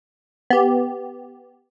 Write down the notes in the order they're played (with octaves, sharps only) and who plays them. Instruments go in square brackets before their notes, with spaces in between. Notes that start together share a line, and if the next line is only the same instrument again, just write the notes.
[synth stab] B3 G4